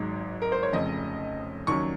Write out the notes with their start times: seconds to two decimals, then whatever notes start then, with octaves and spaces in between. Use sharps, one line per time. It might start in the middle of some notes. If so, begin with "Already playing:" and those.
Already playing: G#1 G#2 F#3
0.42 A#4
0.52 C5
0.63 C#5
0.72 F1 F2 C#3 D#5
1.67 D#2 D#3 F#3 C#4 C#6